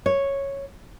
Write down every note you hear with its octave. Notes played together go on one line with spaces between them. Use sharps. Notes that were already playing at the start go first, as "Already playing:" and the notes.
C#5